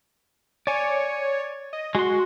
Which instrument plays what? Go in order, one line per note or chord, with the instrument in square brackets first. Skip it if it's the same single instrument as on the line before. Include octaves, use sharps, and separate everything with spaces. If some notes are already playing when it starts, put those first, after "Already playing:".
[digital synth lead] C#5 [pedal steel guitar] D5 G#5
[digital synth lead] D#5
[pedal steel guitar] G#3 C6 [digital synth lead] F#4